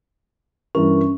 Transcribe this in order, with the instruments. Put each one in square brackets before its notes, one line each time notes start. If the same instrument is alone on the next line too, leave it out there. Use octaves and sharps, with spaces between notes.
[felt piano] G2 E3 A#4 [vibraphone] C#4